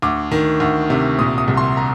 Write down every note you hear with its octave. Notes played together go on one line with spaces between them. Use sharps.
D2 D6
D#3
D2
C3
A#2 D#6
D#6
C2
C6
A#5